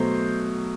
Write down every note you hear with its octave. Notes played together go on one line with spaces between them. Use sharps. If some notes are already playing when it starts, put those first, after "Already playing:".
Already playing: B2 F#3 A3 C5